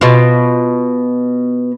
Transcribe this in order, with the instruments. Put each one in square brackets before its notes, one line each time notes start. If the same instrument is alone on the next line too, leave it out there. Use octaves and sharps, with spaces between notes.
[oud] B2 F4